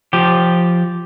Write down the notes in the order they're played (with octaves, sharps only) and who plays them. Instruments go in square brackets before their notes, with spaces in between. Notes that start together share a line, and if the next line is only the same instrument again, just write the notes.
[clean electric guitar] F3 G4